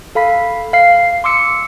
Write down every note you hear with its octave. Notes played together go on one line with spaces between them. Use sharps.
A4 F5 B5 B6
F5 C7
C6 D6 E6 C#7